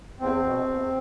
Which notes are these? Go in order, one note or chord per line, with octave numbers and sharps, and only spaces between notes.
E2 C4
B2
E2